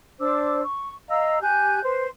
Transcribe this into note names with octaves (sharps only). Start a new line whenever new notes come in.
D4 C5 D6 E6
C#6
D#5 F5 A#5 E6
G4 G#5 F#6 G6
B4 C5